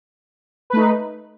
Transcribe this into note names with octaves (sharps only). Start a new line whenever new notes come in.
A3 D#4 B4